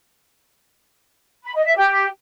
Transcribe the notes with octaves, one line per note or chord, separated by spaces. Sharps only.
B5
D#5
E5
G4